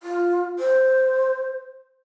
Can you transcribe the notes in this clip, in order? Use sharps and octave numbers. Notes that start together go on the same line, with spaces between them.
F4
C5